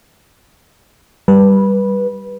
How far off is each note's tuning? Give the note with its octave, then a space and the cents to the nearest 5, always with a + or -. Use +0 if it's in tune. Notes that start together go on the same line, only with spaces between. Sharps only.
G3 +0 B4 -15